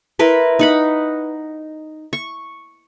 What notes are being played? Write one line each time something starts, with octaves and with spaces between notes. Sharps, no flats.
E4 A#4 B4 C6
D#4 F#5 B5
C#6